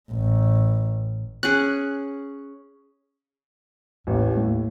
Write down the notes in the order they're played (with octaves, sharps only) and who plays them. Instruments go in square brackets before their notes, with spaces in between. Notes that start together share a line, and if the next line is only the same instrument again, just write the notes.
[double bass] A1
[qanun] C#4 G#4 [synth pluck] F#6
[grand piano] A1 [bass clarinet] D#2
[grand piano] A2